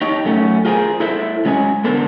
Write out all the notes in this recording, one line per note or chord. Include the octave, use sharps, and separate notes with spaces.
D#4 G4 C#5
F#2 A3 C#4
F4 F#4 G#4 A#4 C5 G#5
E4 A4 C5 E5
F#3 G#3 C#4 C#5 G#5
D3 B3 A4 A#4 C5